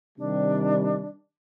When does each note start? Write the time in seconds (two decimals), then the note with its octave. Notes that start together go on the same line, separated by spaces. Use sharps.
0.18 C3 D#3 G3 D4